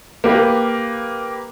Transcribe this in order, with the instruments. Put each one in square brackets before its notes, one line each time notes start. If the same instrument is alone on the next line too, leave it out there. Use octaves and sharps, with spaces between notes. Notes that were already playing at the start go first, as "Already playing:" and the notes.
[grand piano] A#3 G4 B4